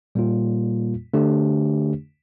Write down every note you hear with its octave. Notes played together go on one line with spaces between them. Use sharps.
A#2 G3 A#3 F4
D3 A3 D4 G4